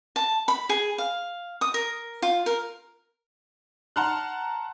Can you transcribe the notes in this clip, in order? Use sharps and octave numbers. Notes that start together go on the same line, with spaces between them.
A5
B5
G#4
F5
D#6
A#4
F4
A#4
F#5 A5 A#5 C6 F6 F#6